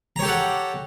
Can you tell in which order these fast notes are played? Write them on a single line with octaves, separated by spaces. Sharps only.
A#5 C#5 G4 A4 F#5